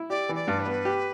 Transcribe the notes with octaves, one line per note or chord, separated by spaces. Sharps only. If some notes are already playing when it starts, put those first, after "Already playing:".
Already playing: E4
G4 D5
E3
D5
G2
B4
B3
G4